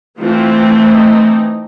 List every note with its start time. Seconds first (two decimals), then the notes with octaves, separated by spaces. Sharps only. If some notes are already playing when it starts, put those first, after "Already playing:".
0.19 E3 A3 C4 F4
0.88 D#4